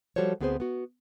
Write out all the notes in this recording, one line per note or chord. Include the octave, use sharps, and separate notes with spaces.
F3 G3 F#4 A4 C5 C#5
D2 B3 C4 G#4 B4 C5
B3 F#4